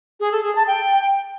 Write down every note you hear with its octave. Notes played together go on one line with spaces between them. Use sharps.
G#4
A4
G#4
A5
G5